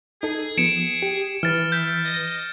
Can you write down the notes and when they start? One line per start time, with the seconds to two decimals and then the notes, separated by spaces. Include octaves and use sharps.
0.23 D#4 G#4 A4
0.58 F3 B3 C#7 D7 E7
1.02 G4
1.43 E3 B4 F6 A6
1.72 E5 G6
2.05 D#5